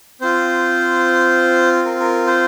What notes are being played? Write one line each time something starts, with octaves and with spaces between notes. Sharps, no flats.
C4 F4 C5
A#4
A#4
C5